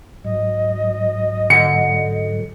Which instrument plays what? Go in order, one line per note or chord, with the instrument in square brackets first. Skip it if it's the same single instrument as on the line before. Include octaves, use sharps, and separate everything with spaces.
[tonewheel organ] G#2 F#3 [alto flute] D#5
[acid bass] D3 [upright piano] C#7